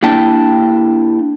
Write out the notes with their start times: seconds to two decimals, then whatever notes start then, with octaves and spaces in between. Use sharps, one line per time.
0.03 A#3 D4 E4 G4 G5 A5